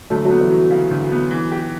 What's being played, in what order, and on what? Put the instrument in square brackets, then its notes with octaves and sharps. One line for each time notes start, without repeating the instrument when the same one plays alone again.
[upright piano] D2 [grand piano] F#3 A3
[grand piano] F#3 A3
[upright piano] B3
[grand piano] E3 G3
[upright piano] F#3
C#3
D2
B3
E3
G4